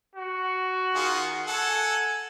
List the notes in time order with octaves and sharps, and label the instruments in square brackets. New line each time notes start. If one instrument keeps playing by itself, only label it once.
[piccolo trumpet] F#4
[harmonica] D#3 F4 G#4
[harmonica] A4 F#5 [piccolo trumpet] G#5